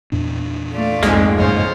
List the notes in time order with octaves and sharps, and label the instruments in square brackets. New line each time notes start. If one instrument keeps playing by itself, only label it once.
[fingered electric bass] E2 A#2 D4
[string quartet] A3 F4 D5
[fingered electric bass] B1 [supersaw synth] F2 G#3 [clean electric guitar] G#2 A#3
[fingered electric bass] F#2 A2 C#3 [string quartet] F4 C5 C#5